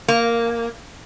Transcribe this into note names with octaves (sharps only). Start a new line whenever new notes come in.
A#3